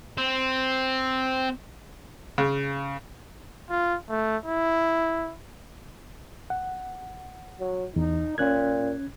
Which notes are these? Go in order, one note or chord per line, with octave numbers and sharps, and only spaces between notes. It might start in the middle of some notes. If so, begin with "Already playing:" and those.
C4
C#3
F4
A3
E4
F#5
F#3
E2 D#4
A#2 C#4 F#6 G#6